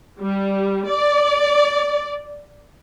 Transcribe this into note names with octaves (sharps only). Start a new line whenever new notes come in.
G3
D5